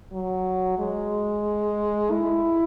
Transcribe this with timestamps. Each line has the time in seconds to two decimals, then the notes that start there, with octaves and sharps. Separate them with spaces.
0.13 F#3
0.79 G#3
2.11 E4